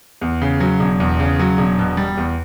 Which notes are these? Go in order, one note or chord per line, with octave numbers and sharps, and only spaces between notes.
E2
C#3
F#3
E1
E2
C#3
F#3
E1
B2
G3
E2